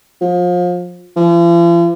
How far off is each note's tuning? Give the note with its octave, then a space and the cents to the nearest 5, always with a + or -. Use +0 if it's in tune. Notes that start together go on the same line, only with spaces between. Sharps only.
F3 +30
F3 -45